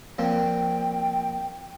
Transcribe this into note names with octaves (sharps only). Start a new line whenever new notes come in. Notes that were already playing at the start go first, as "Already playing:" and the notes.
A#2 F3 C4 G5